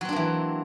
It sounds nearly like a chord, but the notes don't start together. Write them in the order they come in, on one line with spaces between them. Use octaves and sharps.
F#3 C4 D4 A#3 E3